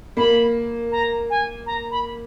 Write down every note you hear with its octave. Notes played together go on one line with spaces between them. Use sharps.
A#3 B5
A#5
G#5
A#5
B5